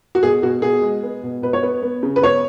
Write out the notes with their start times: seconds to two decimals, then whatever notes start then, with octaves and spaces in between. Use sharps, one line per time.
0.15 F#4
0.23 B2 G#4
0.42 B2 F#4
0.62 B2 G#4
0.82 G#3
1.03 B3
1.23 B2
1.42 B2 B4
1.53 C#5
1.63 B3 B4
1.83 B3
2.03 C#3
2.16 B4
2.22 B3 C#5